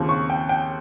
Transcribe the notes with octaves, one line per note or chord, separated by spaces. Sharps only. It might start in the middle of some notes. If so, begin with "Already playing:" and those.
Already playing: D#2 C#3 F3 C4
C#6
G5
G5